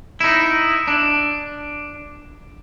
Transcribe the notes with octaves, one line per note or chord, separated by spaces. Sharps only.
D#4 E4
D4